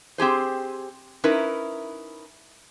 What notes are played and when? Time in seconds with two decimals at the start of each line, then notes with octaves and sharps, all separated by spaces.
0.18 C4 G4 G#4 C5
1.24 C#4 D#4 E4 A#4 B4